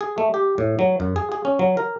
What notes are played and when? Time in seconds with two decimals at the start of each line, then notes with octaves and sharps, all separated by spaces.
0.01 G#4
0.18 A3
0.34 G4
0.58 A2
0.79 F#3
1.00 F#2
1.16 G#4
1.32 G#4
1.45 C#4
1.59 F#3
1.77 A#4